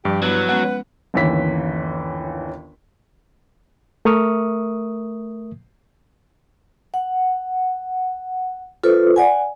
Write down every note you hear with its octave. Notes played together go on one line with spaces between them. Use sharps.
G2 F3 G4
F#3 B3 E4 B4
G#3 B3 C#4 F#5
G1 D#2 E3 C#4 B6
A3 A#4 E5 C#6 D#6 F6
F#5
F4 A4 B4 C5
D5 F#5 G#5